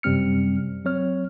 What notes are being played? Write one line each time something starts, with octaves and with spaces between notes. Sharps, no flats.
F#2 C3 G3 C4 F6 C#7
F#3 C4 C#5 F6